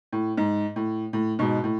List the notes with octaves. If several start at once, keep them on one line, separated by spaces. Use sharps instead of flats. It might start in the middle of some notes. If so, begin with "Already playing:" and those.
A2
G#2
A2
A2
G#2 B2
A2